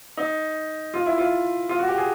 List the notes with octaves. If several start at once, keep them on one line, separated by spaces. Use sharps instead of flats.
D#4
F4
E4
F4
F4
F#4
G4
G#4